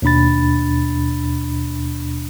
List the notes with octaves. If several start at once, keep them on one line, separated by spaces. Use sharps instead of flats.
D#2 B2 D4 B5 A6